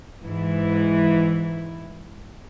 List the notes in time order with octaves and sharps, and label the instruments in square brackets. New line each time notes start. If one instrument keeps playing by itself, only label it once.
[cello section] G#2 E3 E4